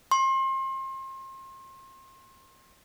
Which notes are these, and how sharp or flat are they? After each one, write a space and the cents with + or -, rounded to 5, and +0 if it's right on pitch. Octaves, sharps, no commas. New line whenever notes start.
C6 +35